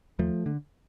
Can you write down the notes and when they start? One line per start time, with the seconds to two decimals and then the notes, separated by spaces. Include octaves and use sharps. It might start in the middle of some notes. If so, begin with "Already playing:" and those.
0.19 D#2 F3 A3
0.46 D3